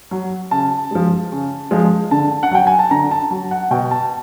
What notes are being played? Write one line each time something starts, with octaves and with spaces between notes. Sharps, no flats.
F#3
C#3 A5
F3 G#3
C#3
F3 G#3
D3 A5
F#5
F#3 G5
G#5
A5
D3 A#5
A5
F#3
F#5
B2 G5
A5